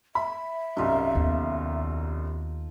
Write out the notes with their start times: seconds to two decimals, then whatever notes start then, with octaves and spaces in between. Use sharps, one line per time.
0.15 E5 B5
0.77 C2 F#2 D#4 F4 A4
1.15 D#2 B3